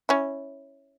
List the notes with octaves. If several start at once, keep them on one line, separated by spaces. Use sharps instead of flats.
C#4 E4